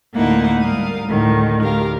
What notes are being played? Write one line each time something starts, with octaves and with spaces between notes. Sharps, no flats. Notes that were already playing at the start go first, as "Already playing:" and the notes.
D2 A2 A#3 D#4 E4 F#5
G#2 G3 A#4 F5 D#6
D2 A2 D#3
D2 G4 A#4 F5